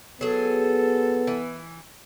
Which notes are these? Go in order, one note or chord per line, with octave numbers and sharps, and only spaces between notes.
F#3 B3 G#4 A4
E3